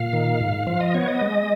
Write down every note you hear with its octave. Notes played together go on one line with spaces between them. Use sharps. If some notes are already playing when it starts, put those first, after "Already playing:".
Already playing: A#2 F5
D#3
G#2
F3 F5
D#5
B3 C#5
D#5
G#3